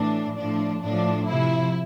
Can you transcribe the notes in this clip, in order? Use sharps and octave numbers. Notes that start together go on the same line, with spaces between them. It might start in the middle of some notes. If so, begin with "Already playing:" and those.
Already playing: A2 E3 D4
A2 F3 D4
A2 F3 D4
C3 F3 E4